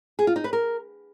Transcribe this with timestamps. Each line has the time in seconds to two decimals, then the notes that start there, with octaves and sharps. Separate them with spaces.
0.19 G#4
0.27 F4
0.36 D#4
0.44 B4
0.53 A#4